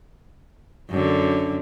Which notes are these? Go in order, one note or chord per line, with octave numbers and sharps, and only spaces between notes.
F#2 D3